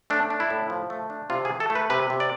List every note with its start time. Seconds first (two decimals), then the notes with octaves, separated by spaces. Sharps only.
0.10 A3 D4
0.30 D4
0.40 E4
0.50 A2
0.70 F3
0.90 A3
1.10 D4
1.30 C3 F4
1.45 G#4
1.50 E3
1.60 A4
1.70 A3
1.75 B4
1.90 C3 B4
2.10 C3
2.20 D5